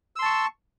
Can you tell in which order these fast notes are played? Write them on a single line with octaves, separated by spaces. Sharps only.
E6 C6 A5 C#6